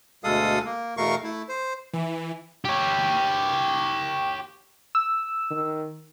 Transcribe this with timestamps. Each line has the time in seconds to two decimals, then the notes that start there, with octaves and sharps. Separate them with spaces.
0.24 D2 B2 G#3 A4 F5 D#6
0.65 A#3
0.97 E2 B2 A3 A#4 F5 C#6
1.24 A3 E4
1.49 C5
1.93 E3
2.65 G4 C#5
4.95 E6
5.51 D#3